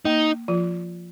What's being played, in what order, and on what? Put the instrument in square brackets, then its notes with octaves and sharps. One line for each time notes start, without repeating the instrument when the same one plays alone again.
[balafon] A#3 [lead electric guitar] D#4
[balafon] F3 F4